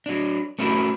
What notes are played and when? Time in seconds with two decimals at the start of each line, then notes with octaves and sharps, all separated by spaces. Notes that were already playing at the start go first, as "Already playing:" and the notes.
0.06 F#3 D4
0.59 A3 C#4 E4 F#4 A#4